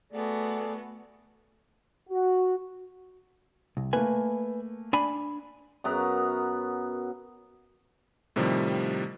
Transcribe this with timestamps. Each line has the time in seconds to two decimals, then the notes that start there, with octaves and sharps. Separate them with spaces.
0.12 A3 B3 F#4 G#4 A4 D5
2.10 F#4
3.77 C2
3.93 A3 A#3 B4 G#5
4.93 D4 G#5 B5
5.84 F#2 B3 A#4 F#5
8.36 A2 C3 D#3 F3 G3